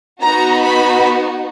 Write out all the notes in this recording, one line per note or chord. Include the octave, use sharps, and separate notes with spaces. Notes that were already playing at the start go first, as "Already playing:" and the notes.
B3 D#4 F#4 A#5
B5